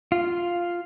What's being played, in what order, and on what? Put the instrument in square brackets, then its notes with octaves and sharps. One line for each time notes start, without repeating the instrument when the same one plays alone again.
[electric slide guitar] F4